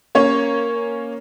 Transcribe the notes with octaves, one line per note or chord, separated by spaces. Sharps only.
A#3 C#4 C#5